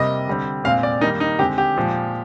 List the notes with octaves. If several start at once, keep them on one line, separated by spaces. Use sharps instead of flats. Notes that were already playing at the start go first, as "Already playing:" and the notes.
Already playing: C3 G3 A#3 D#5
D3 G3 C4
A#2 G#3 C4 F5
D5
D#3 G3 A#3 D#4
D#4
D3 G#3 C4 G4
G4
A#2 F3 G#3